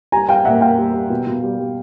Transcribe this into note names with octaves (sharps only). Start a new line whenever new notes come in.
G3 G#5 A#5
G3 F5 G5
A#2 E5 F#5
A#2 F5 G5
G3
G3
B2
B2
G3
G3